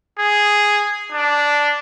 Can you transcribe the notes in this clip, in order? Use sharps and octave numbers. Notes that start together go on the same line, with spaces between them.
G#4
D4